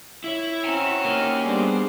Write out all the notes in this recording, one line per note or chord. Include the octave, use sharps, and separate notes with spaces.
E4 C#5
C4 C#4 F#4 G5 A#5
A#3 D#4
G3 B3 D4 G#4 C5